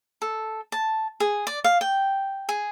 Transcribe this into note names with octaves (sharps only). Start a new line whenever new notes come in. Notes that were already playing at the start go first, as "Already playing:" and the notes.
A4
A5
G#4
D5
F5
G5
G#4